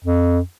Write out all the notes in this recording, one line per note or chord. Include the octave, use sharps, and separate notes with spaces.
F2